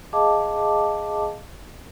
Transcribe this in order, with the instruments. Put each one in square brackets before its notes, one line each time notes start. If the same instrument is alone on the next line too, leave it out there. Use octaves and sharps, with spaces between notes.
[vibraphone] G#4 D#5 F5 A5 D6